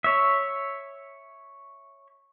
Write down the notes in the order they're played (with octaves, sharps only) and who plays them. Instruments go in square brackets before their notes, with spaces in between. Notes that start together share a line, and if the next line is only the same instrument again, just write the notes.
[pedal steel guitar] C#5 E5